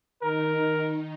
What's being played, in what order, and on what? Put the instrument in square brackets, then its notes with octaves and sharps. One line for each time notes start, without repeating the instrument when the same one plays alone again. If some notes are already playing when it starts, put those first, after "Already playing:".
[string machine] D#3 D#4 [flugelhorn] A#4